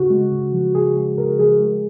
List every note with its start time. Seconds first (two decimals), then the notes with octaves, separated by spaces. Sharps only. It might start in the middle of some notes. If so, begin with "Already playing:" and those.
Already playing: C#3 F#4
0.10 G#3
0.32 C#3
0.53 F3
0.75 C#3 G#4
0.96 G#3 G#4
1.17 C#3 A#4
1.39 F3 G#4
1.60 G#3